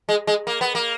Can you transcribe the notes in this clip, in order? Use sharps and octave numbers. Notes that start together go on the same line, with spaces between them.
G#3
G#3
A#3
B3
A#3